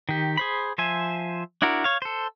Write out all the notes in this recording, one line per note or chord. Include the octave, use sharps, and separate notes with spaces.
D#3 G4
G#4 C5 B5
F3 C5 E5 G#5
D4 E4 F#4 A#4
C#5 F5
A4 C5